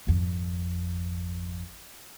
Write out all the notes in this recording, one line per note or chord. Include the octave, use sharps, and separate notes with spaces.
G#1 F2